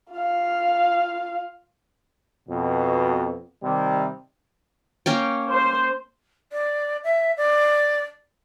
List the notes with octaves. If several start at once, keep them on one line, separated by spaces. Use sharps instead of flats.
F4 F5
F2 B2
C3 D#3 G3
A#3 C#4 G5
C5
D5
E5
D5